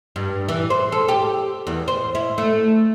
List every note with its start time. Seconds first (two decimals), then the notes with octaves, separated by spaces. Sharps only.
0.16 G2
0.49 E3
0.70 C5
0.92 A4
1.08 G4
1.67 E2
1.88 C5
2.15 E4
2.38 A3